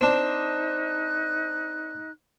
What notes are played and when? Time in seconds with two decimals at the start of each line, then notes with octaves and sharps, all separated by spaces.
0.01 C4 D4 D#4 F#6